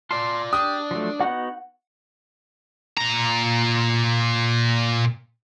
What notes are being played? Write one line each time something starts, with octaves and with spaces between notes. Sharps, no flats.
F4 D5 A5 C6
D4 G4 D#6
F3 F#3 A3
B3 D#4 F#4 F#5
A#2 A#5